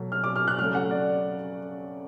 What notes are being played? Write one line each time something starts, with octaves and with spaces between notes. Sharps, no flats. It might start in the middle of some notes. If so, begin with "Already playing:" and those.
Already playing: B2 F#3 A3
F6
D6
F6
F#6
C#3 F#3 A3 F6
F#5
D5